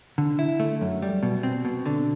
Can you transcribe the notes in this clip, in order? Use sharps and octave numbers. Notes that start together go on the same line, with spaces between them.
D3
E4
A3
F#2
G3
B2
C4
B2
D3